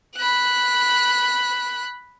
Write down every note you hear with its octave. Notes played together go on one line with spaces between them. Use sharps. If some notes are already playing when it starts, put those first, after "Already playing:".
B5 F#6